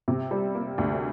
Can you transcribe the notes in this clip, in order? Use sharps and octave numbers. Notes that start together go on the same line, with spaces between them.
C3
G3
A#3
D2